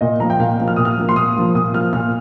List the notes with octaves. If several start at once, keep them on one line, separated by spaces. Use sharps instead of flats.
A#2 D#5
F3 A#3 A#5
G5
A#2 F5
F3 A#3
F6
A#2 D#6
F6
F3 A#3
C6
A#2 D#6
F3 A#3
A#2 D#6
F3 A#3 F6
A#2 F6